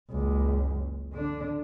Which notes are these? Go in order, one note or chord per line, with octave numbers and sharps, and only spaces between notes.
F#1 C#2
D3 D4